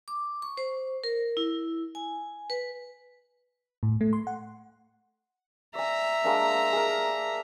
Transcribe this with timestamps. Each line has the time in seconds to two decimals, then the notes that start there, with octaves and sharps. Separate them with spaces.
0.08 D6
0.42 C#6
0.57 C5
1.04 A#4
1.37 E4
1.95 G#5
2.50 B4
3.83 A2
4.01 A3
4.13 C6
4.27 F#5
5.75 D5 E5 G#5 A#5
6.24 G#3 A#3 D4
6.73 G#4 A#4